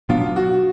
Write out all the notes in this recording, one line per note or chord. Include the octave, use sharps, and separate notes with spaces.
B2 F#3 B3 D4 F4
F#4